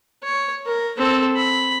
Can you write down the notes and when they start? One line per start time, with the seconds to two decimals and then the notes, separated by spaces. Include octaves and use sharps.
0.24 C#5
0.66 A#4
0.98 C4 A4
1.37 B5